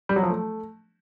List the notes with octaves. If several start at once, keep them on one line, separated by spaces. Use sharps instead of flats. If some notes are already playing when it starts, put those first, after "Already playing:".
G3
F#3
F3
A3